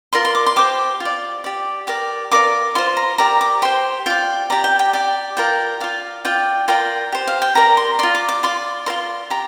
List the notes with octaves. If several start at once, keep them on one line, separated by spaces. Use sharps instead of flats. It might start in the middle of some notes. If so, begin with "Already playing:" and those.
F4 A#4 D5 C6
C6
D6
C6
G4 C5 D6
F4 D5
G4 D5
G4 A#4 D5 D6
F4 A#4 D5 D6
F4 C5 C6
A#5
G4 A#4 D5 A#5
D6
G4 C5 C6
F4 D5 G5
G4 D5 A#5
G5
G5
G4 D5 G5
F4 A#4 D5 G5
F4 D5 F5
F4 D5 G5
F4 A#4 D5 G5
G4 C5
F5
G5
G4 A#4 D5 A#5
C6
F4 D5 C6
D6
D6
F4 D5 C6
F4 A#4 D5 C6
G4 A#5